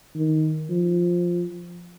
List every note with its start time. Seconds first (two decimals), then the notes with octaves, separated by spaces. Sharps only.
0.15 D#3
0.69 F3